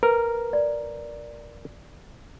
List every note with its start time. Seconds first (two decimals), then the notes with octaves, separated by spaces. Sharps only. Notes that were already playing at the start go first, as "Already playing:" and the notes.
0.03 A#4 B4
0.53 D5